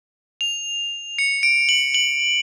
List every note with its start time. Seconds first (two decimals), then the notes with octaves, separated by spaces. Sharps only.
0.41 F7
1.18 C#7
1.43 D7
1.69 F#7
1.94 F#7